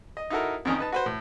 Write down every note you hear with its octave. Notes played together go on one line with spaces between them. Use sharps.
D#5
D#4 E4 F#4 A4 A#4
F2 D#3 C#4
D#4 B4 A5
F#4 B4 C5
A2